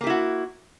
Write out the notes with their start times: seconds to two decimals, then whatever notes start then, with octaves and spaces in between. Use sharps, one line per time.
0.01 A#3
0.04 G4
0.07 E4
0.10 F#4